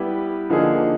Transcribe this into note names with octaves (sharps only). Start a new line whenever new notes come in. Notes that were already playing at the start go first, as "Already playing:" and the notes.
Already playing: G3 B3 E4 G4 B4
D3 F3 A#3 D#4 G#4